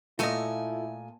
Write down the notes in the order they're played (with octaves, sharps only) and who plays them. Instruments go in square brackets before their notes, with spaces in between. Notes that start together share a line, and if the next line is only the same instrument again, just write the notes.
[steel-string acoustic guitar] A#2 G#5 A5 [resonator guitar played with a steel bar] A3 D#5 [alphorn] E4 [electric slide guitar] F4 A4